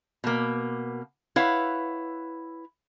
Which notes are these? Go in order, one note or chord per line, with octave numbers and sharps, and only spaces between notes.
B2 A#3
E4 B4 C#5 F5 F#5